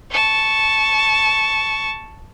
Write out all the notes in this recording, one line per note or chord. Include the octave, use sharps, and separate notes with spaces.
A5 C#6